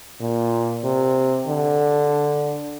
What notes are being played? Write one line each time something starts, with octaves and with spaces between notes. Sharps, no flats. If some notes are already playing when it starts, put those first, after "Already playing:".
A#2
C3
D3